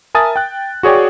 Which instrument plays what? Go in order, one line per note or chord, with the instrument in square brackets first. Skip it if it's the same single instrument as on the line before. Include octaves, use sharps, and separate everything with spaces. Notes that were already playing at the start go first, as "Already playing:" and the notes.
[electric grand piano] A#4 E5 G#5 A5 D#6 A6
G5 F#6
F#4 G#4 C#5 D5 G5